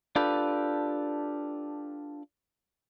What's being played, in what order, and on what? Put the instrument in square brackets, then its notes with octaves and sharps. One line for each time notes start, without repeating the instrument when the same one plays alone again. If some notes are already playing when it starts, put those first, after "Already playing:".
[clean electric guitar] D4 F4 G4 A4 B4